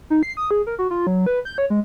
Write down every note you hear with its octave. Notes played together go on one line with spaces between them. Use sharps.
D#4
C7
D#6
G#4
A#4
F#4
F4
F#3
B4
G6
C#5
G#3